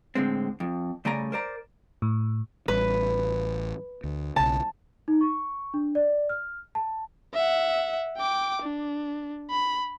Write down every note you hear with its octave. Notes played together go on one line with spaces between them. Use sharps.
A2 D3 G#3 C4
F2
C#3 G3 A3 D5 G#5 A#5
A#4 C5 D5 A#5
A2
A1 G3 B4
D2
B1 C#3 A5
D#4
C#6
D4
D5
F6
A5
E5 F#5
G5 D6
D4
B5